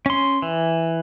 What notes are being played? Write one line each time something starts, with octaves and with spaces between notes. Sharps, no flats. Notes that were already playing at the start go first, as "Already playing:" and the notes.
C#4 C6
E3